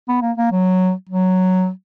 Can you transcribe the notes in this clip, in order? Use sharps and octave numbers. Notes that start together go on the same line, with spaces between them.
B3
A#3
A#3
F#3
F#3